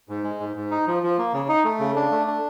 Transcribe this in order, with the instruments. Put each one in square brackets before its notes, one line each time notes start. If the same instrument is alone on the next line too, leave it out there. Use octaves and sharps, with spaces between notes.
[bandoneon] G#2
G#3
G#2
G#2
D#4
F3
F3
A#3
C#3
D#4
A3
C#3
D4
A3
D4